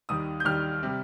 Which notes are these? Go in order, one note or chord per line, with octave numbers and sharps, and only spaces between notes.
D#2 D#3 G3 D#6
G6
D#2 D#3 G3 F6
C3 G3